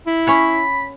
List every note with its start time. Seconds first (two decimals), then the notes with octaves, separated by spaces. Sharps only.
0.06 E4
0.27 C#4 C#5 F#5 B5